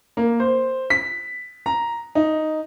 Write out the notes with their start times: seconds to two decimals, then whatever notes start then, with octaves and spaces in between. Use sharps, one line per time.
0.17 A#3
0.40 C5
0.90 B6
1.66 A#5
2.15 D#4